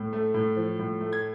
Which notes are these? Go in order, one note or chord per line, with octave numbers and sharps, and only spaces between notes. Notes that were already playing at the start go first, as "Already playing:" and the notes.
Already playing: A2
A3
A2
F3
A2
A3
G#6